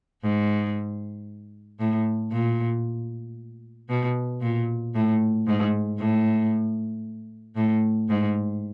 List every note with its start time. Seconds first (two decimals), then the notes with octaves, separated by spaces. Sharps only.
0.23 G#2
1.80 A2
2.32 A#2
3.90 B2
4.42 A#2
4.95 A2
5.47 G#2
5.99 A2
7.56 A2
8.09 G#2